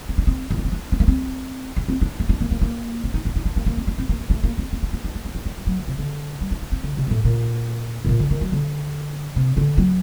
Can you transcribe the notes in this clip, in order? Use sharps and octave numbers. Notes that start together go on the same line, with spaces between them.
C4
D4
C4
D#4
D4
C4
D4
C4
A#3
C4
D4
C4
D4
D#4
D4
A#3
A#3
A#3
C4
D#4
D4
D#4
D4
A#3
A#3
C4
D4
C4
A#3
A#3
A3
A#3
C4
C4
D4
D4
D#4
D4
C4
A#3
A3
G3
F#3
D3
C3
D3
G3
D4
D4
C4
D3
C3
G2
A2
A#2
A2
A#2
D3
D#3
F#3
D3
C3
D3
F#3